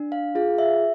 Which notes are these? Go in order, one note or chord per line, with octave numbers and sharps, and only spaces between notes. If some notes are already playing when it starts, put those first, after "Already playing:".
Already playing: D4
F5
F4 G#4 F5
E5